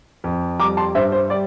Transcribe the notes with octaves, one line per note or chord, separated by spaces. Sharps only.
F2
G3 A#5 D6
A5 C6
G2 C5 E5
C5
G3 D5